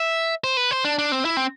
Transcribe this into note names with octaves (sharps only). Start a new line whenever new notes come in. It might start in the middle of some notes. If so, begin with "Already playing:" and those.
Already playing: E5
C5
B4
C5
D4
D4
C4
E4
C4